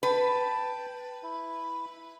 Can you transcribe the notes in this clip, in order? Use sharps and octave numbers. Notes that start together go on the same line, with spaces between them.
B4 G5 A5
E4